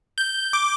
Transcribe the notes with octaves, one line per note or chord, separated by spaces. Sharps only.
G6
D6